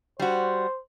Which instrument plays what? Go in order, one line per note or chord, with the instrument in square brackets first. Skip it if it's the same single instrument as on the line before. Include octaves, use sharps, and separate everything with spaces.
[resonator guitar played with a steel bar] G3 F#4 [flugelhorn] C5